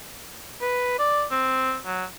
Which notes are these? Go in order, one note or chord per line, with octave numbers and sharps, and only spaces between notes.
B4
D5
C4
F#3